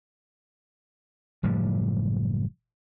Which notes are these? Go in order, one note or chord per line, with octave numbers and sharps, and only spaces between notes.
F#1 A2 F3 G3